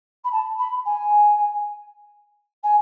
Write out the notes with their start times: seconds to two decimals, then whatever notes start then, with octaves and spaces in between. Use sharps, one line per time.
0.24 B5
0.31 A5
0.58 B5
0.85 G#5
2.63 G#5